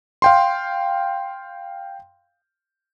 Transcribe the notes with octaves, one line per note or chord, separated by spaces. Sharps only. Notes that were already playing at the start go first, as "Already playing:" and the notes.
F5 G5 C6